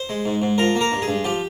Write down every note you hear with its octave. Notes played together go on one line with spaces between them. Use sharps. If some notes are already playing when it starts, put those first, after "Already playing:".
Already playing: C5
G#3
G#2
G#2
F3 A#4
A#3
A#4
G2
G#4
G2
F3 G4